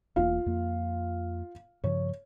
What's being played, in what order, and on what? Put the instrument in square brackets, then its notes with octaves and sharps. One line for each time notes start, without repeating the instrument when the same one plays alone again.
[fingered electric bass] E1 E2 A#3 [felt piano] F4 F5
[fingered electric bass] F2 A#3
[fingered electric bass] G2 C#3 F3 [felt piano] C#5